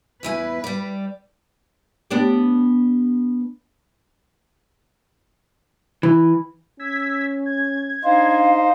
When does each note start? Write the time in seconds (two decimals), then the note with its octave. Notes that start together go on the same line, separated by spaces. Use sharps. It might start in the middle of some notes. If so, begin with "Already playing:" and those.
0.23 E2 E4 B4 G#5
0.64 G3 D5
2.11 B3 D4 G4
6.03 E3
6.79 C#4 E6 G#6 B6
7.46 G#6
8.04 D4 D#4 C5 F5